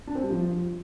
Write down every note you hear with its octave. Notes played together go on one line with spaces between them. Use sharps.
D4
C4
G3
F3